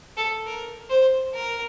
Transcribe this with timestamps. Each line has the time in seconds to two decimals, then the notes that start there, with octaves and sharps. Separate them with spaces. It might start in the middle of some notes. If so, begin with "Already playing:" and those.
0.17 A4
0.46 A#4
0.90 C5
1.34 A#4